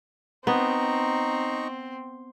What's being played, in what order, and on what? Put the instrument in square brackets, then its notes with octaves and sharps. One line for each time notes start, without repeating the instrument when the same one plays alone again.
[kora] B3 [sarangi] C4 [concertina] D#4 A#5 C#6